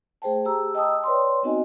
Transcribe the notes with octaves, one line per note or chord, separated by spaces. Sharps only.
A3 G#4 C5 G5 A5
G4 A#5 E6
D#5 G5 A5 D#6 E6
B4 C#5 D5 G5 C6
B3 C4 D#4 F#4 D#5 G#5